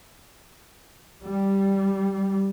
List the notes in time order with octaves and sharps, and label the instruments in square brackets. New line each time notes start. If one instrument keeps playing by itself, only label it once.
[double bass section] G3